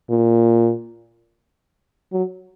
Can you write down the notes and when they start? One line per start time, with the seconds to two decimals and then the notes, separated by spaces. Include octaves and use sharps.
0.10 A#2
2.13 F#3